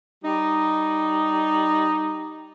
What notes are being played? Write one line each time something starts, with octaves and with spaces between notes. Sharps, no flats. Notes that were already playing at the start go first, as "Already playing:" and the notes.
G3 D#4